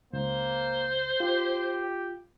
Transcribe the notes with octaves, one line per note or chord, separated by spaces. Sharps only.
C#2 A#3 C5
F4 G4